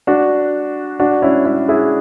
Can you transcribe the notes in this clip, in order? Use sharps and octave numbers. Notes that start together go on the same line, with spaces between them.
D4 F#4
D4 F#4
C#4 E4
C#4 E4
E4 G#4